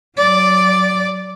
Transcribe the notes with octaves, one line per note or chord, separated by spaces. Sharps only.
F#3 D5